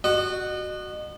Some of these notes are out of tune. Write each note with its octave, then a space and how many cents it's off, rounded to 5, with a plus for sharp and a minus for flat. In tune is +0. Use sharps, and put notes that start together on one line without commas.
F#4 +0 D#5 -35